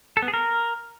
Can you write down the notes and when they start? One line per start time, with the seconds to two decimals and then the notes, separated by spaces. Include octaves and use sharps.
0.17 A4
0.22 B3
0.28 G#4
0.34 A#4